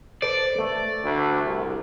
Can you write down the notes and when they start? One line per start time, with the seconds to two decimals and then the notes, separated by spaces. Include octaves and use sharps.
0.22 A4 B4 C5 D5
0.59 A3
1.03 D2
1.45 C2